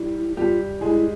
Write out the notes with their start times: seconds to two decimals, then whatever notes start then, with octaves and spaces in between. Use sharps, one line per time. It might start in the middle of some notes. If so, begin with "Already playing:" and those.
Already playing: G3 E4 G4
0.37 G3 F4 G4
0.81 G#3 E4 G#4